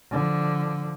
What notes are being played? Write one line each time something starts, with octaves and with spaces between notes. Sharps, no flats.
D3 F3